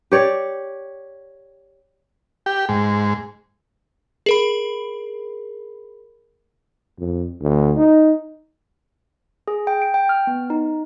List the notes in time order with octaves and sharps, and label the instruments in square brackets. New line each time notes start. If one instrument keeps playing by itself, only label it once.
[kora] G4 C#5 D5
[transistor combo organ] G4
G#2
[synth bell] G#4 A#4 B5
[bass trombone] F2
D2
D#4
[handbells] G#4
G5
D7
G5
F6
B3
D#4